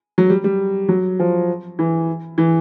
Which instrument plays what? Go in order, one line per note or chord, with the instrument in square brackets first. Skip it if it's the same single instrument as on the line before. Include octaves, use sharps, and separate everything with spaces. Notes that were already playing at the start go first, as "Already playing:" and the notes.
[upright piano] F#3
G3
G3
F#3
F3
E3
E3